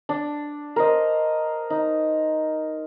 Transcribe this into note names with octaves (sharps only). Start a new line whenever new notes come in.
D4
A#4 C5 D#5
D#4